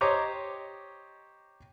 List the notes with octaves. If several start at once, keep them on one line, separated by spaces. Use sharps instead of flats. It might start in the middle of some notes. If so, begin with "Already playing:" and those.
G4 C5 C#5 D#5 A#5 D6